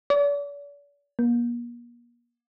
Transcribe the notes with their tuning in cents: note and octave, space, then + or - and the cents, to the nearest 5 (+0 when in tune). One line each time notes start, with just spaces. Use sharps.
D5 -45
A#3 +40